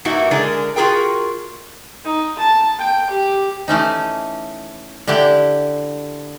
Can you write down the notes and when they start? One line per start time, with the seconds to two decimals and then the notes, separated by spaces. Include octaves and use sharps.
0.05 G2 E3 A#3 D#4 E4 F#4
0.31 D3 G#3 D4 G#4 A#4
0.76 F4 F#4 G#4 A#4 G5
2.05 D#4
2.39 A5
2.79 G5
3.10 G4
3.68 E3 A3 C#4 D#4
5.07 D3 D4 E4 G4